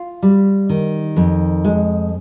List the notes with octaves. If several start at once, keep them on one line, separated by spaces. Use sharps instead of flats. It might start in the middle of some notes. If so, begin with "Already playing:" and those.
Already playing: F4
G3
D#3
F2
G#3